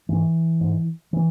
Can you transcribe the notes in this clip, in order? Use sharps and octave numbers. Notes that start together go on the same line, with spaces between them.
G#2 E3
G#2
E3